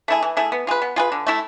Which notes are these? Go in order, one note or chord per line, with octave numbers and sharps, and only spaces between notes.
A3 E4 G#4
E3
A3 E4 G#4
B3
F4 G#4 B4
B3
F4 G#4 B4
D3
A3 E4 A4